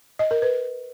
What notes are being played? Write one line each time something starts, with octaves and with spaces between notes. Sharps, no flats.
D#5
A#4
B4